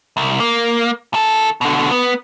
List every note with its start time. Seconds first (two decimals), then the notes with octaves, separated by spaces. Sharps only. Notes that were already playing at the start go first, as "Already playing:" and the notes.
0.17 C2
0.40 A#3
1.14 D#3 A4
1.61 B2 D3
1.91 B3